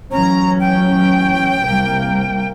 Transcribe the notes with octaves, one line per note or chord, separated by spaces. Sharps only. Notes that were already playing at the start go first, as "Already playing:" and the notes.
A1 F#3 C#4 A#5
G5
C2 A#3